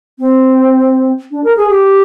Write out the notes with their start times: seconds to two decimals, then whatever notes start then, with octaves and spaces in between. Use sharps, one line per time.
0.19 C4
1.31 D4
1.44 A#4
1.57 G#4
1.69 G4